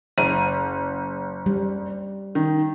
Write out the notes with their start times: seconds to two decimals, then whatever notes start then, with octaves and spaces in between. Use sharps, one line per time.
0.18 F#1 D#7
1.46 G3
2.35 D#3